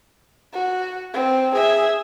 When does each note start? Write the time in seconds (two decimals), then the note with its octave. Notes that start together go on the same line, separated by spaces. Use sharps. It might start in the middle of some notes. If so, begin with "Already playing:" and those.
0.53 F#4
1.13 C4
1.55 G#4 E5